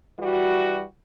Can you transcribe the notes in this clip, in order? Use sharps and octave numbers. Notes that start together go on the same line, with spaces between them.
E3 G3 F#4